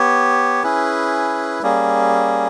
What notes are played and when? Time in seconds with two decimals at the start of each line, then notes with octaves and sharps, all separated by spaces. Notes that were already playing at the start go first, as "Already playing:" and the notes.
Already playing: B3 G4 C#5
0.63 C#4 E4 G#4 B4
1.63 G3 A#3 C#4 G#4